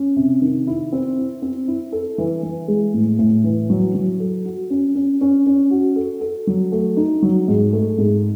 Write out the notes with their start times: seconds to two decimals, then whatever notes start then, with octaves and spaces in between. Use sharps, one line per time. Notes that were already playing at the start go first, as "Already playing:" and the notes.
Already playing: C#4
0.16 C3
0.42 D#3
0.67 E4
0.92 C4
1.18 E4
1.42 C4
1.68 E4
1.92 A4
2.18 E3
2.43 E3
2.68 G#3
2.94 A2
3.19 A2
3.44 E3
3.70 F#3
3.94 F#3
4.19 A4
4.45 F#4
4.70 C#4
4.95 C#4
5.21 C#4
5.46 C#4
5.70 F#4
5.96 A4
6.21 A4
6.47 F#3
6.72 A3
6.97 D#4
7.22 F#3
7.48 G#2
7.73 A3
7.98 G#2